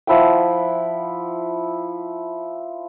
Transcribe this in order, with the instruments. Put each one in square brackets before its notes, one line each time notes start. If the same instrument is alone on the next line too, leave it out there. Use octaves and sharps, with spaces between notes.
[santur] F3 E4 F#5 G5